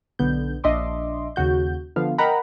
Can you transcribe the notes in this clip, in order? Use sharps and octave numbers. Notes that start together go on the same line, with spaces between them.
B1 D3 B3 G6
A#1 D4 D#5 E5 C6 D6
D#2 C#3 F#4 G6
D3 F3 B3 F5
A#4 D#5 F#5 G5 A#5 B5